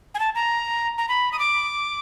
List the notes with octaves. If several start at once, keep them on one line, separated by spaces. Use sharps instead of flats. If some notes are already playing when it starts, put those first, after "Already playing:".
G#5
A5
A#5
A#5
B5
D#6
D6